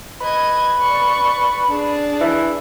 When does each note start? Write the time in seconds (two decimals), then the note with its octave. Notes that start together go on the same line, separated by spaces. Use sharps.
0.21 B4 D#5 G#6
0.80 D5 C#6
1.68 D4 G#4
2.21 E3